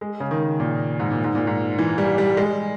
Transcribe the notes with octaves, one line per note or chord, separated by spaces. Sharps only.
G#3
C#3
D#3
A#2
G#2
A#2
G#2
A#2
G#2
E3
G3
G3
G#3